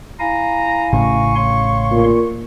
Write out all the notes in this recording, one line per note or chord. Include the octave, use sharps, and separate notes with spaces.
E4 F5 G#5 A#5
A1 A2 C#3 C#6
C#5 F5 C6
A#2